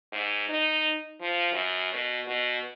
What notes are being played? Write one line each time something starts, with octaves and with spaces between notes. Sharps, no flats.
G#2
D#4
F3
F#2
B2
B2